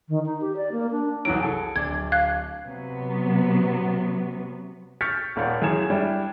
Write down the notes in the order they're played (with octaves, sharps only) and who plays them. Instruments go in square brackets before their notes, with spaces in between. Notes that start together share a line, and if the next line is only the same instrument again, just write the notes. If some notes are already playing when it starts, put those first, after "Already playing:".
[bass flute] D#3
D#4
G4
D5
A#3
D4
[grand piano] C2 E3 F#3 [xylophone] D7
[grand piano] G#4 A4 G#5
[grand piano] D1 D4 [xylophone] G#6
[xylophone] F5 F#6 G#6
[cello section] C3 F#3 B3
[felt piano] C#6 F6 G6 A6 B6 C#7
D#1 D#2 D5 F5 F#5
F#2 E3 G#4 C#5 G#6 E7
G3 D4 E4